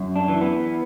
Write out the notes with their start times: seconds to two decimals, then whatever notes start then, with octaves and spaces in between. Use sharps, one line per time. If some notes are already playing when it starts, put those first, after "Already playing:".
Already playing: F#2
0.16 D4
0.28 E3
0.41 B3